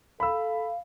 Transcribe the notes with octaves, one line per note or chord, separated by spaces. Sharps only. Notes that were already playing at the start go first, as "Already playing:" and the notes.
A4 F5 B5 E6